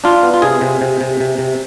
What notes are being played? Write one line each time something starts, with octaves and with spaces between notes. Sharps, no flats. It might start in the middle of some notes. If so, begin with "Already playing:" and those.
D4 F4
B3
F4
C3 G#4
C3
C3
C3
C3
C3